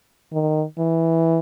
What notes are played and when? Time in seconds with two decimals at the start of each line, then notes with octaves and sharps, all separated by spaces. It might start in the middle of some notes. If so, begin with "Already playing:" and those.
0.32 D#3
0.78 E3